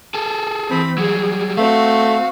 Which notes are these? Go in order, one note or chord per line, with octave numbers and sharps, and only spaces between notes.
G#4 A4
E3 C4 B5
F#3 G3 G#4
A3 C4 F#4 F5